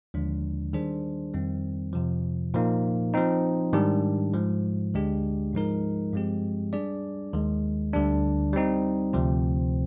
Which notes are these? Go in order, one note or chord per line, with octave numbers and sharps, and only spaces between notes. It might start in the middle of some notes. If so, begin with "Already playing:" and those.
D#2 D3 F3 G#3 D4
D#3 G3 D4 G#4 C5
F2 D#3 G3 C4
F2 C3 F3
A#2 F3 A#3 D#4
F3 C4 D#4
G#2 D#3 G3 D4 G4
G#2 F3 G#3
D2 D3 G#3 D4 G4
G#2 F3 G#3 D#4 A#4
G2 F3 G#3 C4 G4
G3 D4 G#4 D5
D#2 D#3 G#3
D2 D3 G3 D4
G3 C4 D#4
D2 C3 F3 C4